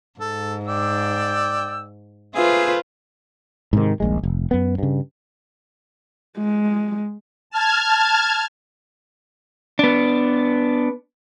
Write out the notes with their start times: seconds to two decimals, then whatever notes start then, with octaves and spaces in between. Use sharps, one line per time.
0.20 G#2 A4
0.67 D5 G5 E6
2.35 A3 F4 G#4 B4 C5 E5
3.73 G#2 C3 D#3
4.00 D#1 A#1 G#3
4.23 F1
4.51 F#2 B3
4.78 G2 C#3
6.38 G#3
7.50 A5 F6 G#6
9.79 B3 D4